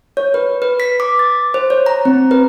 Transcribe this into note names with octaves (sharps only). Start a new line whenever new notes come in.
C#5
B4
B4
B6
D6
A6
C5
C#5
A#5
C4
B4